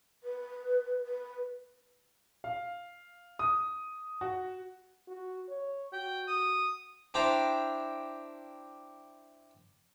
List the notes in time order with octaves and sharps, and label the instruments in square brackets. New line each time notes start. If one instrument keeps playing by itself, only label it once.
[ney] B4
B4
[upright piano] F5
D#6
F#4
[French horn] F#4
C#5
[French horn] F#4 [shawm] G5
[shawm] D#6
[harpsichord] D4 E4 G4 C5 G5 A#5